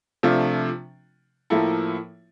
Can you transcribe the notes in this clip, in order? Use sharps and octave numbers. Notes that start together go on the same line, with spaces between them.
C3 F3 A3 D4 F4
A2 F3 A#3 E4 A4